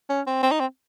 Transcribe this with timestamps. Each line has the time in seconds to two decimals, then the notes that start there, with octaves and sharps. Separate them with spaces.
0.10 C#4
0.27 C4
0.43 C4
0.52 D#4
0.60 C4